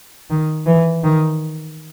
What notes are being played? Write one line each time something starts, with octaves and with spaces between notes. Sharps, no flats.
D#3
E3
D#3